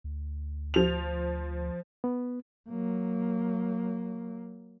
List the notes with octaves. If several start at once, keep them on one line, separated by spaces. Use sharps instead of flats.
D2
F3 F7
B3
F#3 A#3